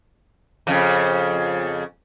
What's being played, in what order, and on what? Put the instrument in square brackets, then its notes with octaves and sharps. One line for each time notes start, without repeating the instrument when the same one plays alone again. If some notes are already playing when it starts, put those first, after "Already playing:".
[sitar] F2 C#3